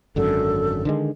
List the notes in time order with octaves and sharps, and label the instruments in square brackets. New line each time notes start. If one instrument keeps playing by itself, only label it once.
[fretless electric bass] G#1 F#2 D3 [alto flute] A4
[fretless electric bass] D3 D#3 G#3